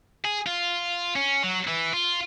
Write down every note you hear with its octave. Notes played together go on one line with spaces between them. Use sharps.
G#4
F4
C#4
F#3
E3
F4